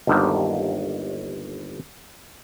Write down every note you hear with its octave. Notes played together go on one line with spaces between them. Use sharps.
G1 D#2 D3 D#3 F#3 G3